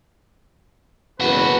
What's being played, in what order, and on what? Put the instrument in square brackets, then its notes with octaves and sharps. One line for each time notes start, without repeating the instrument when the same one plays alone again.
[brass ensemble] F#1 B4 [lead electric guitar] E2 F#4